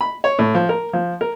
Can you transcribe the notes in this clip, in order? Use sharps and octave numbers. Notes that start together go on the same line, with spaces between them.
B5
C#5
A2
F3
A#4
F3
A#4